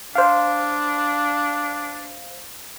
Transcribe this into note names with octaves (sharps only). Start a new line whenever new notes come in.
D4 C5 F5